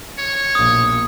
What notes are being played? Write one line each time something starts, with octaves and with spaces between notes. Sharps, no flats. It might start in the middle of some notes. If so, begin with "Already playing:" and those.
C#5
A#1 B2 D#6